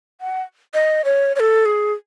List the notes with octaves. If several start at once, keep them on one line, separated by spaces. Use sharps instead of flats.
F#5
D#5
C#5
C#5
A4
G#4